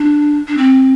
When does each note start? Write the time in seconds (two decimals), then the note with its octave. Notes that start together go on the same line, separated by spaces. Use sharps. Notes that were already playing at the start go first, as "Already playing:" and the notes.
Already playing: D4
0.48 D4
0.57 C4